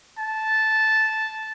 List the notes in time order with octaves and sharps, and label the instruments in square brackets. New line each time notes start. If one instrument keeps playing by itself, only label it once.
[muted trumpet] A5